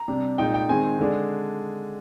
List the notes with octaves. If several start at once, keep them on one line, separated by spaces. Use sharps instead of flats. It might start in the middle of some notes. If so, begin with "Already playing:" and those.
Already playing: A#5
C3 G3 D4
A#2 G#3 D#4 G5
G5
D#3 G#3 C4 G#5
D3 G#3 D4